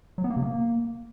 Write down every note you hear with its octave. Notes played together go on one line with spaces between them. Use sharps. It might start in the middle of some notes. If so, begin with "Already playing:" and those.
F#3
B3
A#3
C3
A#3